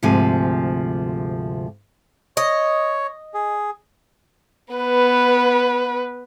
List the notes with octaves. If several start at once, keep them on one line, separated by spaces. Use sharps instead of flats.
D2 G#2 C3 F3 G#5
C#5 D#5
G#4
B3 B4